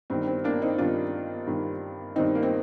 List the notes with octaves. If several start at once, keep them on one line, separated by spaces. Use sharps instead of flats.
G2 D#3 C4
C4
A#3 D4
C4 D#4
G2 D#3 D4 F4
G2 D#3
G2 D#3 C4 D#4
A#3
C4